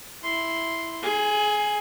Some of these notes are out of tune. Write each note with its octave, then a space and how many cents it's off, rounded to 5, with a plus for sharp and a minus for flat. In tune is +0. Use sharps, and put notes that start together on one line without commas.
E4 +0 C6 +0
G#4 +30 G#5 +0